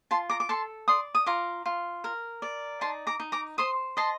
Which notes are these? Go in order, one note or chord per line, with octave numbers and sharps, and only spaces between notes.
F4 A5 C6
A#5 D6
D6
A4 A5 C6
D5 C6 D#6
D#6
F4 A#5 D6
F4
A#4
D5
D#4 A5 C6
A#5 D6
D#4
A#5 D6
C5 C6 D#6
D#5 A5 C6